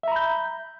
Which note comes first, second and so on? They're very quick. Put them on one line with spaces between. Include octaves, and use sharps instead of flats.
E5 A#5 B5 G6